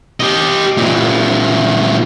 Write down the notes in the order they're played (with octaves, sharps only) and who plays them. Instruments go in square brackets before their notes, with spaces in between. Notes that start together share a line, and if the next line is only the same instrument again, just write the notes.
[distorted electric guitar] G4 D#5
A#2 E3